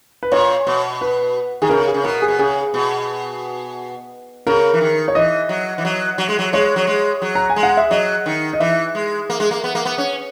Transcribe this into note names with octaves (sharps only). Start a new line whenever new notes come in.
B4
A#2 C#5
B2
B4
D#3 G#4
C#3 A#4
G#4
C#3
B2 A#4
G#4
B2
C#3 G#4
B2
C#3 A#4
E3
D#3
C#5
E3 D#5
F#3
E3
F#3
F#3
G#3
F#3
G#3 C#5
F#3
G#3
F#3
A#5
G#5
G#3
F#5
E5
F#3 D#5
D#3
D#5
E3 E5
G#3
A#3
G#3
A#3
B3
A#3
B3
C#4